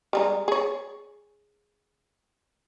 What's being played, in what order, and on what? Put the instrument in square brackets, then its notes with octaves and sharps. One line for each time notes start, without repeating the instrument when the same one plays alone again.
[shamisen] G3 G#3 D#4
G#4 C#5